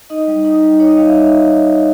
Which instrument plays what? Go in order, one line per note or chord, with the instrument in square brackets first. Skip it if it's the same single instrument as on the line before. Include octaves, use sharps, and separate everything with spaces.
[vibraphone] D#4 D#5
G3
D#4
G3
D#4 C#5
D#5
G3 F5
E5